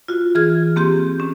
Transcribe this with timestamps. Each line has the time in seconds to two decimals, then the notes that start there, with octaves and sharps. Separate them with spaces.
0.08 F4 F#4
0.35 E3 G#4 F6 G#6
0.76 A#3 C4 G4 C6 G6
1.20 C#4